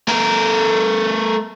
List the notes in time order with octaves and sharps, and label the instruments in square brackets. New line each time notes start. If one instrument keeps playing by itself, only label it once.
[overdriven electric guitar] A3 A#4